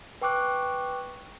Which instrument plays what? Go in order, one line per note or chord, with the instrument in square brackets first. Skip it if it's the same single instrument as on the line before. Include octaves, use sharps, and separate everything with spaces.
[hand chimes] B4 G5 C#6 D6 F#6